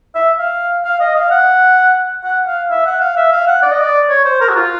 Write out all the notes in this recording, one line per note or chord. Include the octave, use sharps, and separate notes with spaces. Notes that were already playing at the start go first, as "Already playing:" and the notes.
E5
F5
F5
D#5
F5
F#5
F#5
F5
E5
F#5
F5
E5
F5
F#5
D5
D#5
D5
C#5
C5
A#4
F#4
F4